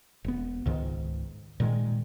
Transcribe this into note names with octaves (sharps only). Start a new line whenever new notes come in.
E1 B3
C#2 G#2 D#3
A#2 D#3 G#3